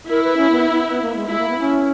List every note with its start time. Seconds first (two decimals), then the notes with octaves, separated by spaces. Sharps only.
0.09 E4 A#4
0.23 B4
0.37 C#4
0.50 B3
0.70 B3
0.89 B3
1.02 A#3
1.16 G#3
1.28 G#3 E4
1.39 A#3
1.49 B3
1.59 C#4